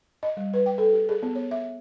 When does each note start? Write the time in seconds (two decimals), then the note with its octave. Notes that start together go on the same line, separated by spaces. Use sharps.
0.23 D#5
0.37 G3
0.54 B4
0.66 G5
0.78 A4
0.93 G4
1.09 G#4
1.23 B3
1.35 C#5
1.51 E5